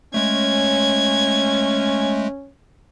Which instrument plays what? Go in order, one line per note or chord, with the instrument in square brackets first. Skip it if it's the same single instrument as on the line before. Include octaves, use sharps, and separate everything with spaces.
[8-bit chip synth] G#3 A3 [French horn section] C#4 [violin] G#6